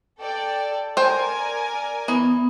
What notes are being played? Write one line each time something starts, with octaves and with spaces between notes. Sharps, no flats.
A4 D5 G5
A#4 C5 D5 G5 G#5
E3 B3 D#6